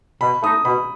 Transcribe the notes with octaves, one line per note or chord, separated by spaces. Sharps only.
B2 B5
A3 D#4 D#6
B2 B5